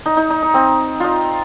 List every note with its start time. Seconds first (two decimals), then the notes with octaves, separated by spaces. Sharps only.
0.06 D#4
0.17 D#4
0.30 D#4
0.43 D#4
0.54 C4
1.00 D#4 F4